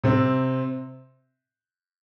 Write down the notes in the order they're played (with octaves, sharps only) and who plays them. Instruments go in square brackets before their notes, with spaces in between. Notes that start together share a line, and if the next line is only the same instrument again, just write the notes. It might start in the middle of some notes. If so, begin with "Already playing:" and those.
[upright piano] C3 C4